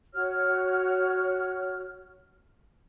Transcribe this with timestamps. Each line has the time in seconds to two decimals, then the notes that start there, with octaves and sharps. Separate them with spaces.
0.14 F#4 C#5 F6